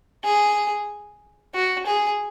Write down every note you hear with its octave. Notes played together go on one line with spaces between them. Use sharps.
G#4
F#4
G#4